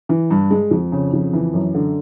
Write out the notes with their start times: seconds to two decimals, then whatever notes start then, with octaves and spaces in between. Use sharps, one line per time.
0.09 E3
0.31 G2
0.51 G#3
0.71 F2
0.92 C#3
1.13 F2
1.33 E3
1.53 F#2
1.74 D3